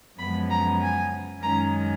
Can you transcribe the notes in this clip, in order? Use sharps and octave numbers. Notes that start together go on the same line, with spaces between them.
F#2 C#3 F3 G#3 B3 B5
A#5
G#5
F#2 D#3 G#3 C#4 A#5